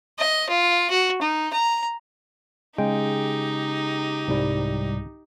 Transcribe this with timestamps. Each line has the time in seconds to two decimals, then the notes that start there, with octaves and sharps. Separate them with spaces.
0.19 D#5
0.49 F4
0.90 F#4
1.22 D#4
1.53 A#5
2.78 C#3 G#3 D#4 G4 G5
4.28 C2 G#2 G3